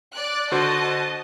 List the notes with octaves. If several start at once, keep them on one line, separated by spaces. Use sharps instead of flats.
D5 F#6
D3 F#4 C5 D#5 A5